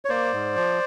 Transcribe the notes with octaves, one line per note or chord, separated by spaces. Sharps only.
C#5
A#3 C5 D5
G#2
F3